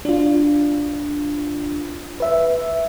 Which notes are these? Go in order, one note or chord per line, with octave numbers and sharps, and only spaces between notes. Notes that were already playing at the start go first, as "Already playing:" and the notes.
D4 F4
B4 E5